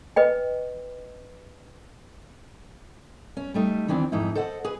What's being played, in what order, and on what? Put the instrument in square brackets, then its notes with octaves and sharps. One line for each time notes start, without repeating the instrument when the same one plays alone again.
[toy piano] B4 D#5 G5
[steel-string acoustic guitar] C#4
G3 A3 D#4
E2 D#3 E3 C4 D4
F2 G#2 D#4 E4
A4 C5 D#5 F#5
G#4 B4